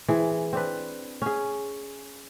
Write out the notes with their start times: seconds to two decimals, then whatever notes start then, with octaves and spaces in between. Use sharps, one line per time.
0.08 E3 C4 G#4
0.53 C4 D4 B4
1.22 C#4 G#4